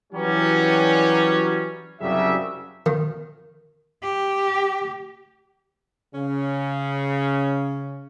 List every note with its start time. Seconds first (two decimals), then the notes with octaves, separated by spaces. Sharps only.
0.13 E3 F#3 G3 C#4
2.00 C2 F#2 C#3 F#3 G3 E5
2.86 D#3
4.02 G4
6.13 C#3 C#4